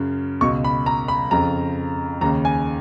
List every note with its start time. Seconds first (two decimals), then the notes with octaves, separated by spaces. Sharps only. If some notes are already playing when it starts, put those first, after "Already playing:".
Already playing: F#2 C#3
0.41 C#2 B2 C#6
0.64 B5
0.86 A#5
1.08 B5
1.31 F2 C#3 A#5
2.21 D#2 A#5
2.24 C#3
2.45 G#5